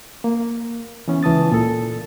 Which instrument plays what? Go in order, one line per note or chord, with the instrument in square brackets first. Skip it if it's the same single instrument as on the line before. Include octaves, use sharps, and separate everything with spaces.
[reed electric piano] A#3
E3 B3 C#4
C#2 E3 A5 D#6 A6
A#2 A4